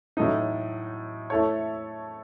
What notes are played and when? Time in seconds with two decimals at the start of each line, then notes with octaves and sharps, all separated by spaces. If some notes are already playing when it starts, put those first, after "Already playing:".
0.17 A2 F#3 A3 D#4
1.30 A3 E4 A4 C#5